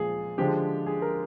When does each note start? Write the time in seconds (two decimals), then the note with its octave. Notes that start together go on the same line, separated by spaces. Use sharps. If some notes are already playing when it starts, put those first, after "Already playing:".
Already playing: A#2 F3 G#3 G#4
0.38 D3 F3 G#3 G4
0.86 G#4
1.02 A#4